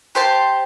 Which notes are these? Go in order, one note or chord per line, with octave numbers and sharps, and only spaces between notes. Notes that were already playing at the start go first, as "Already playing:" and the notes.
G4 C5 A5